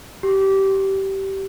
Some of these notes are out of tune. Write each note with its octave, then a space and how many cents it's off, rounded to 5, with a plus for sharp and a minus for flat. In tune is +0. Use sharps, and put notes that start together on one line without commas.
G4 -20